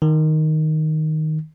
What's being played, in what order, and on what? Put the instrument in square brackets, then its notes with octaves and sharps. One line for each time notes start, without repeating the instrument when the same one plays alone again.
[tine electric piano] D#3